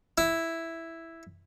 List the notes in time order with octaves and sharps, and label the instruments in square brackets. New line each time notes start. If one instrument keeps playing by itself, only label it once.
[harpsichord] E4